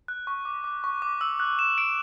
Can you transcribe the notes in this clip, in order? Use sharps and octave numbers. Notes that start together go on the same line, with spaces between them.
F#6
C#6
D6
D6
C#6
D6
E6
F#6
E7
D7